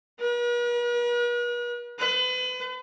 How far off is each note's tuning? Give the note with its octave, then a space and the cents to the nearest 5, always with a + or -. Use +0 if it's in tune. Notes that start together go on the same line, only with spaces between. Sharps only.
B4 -45
B4 +35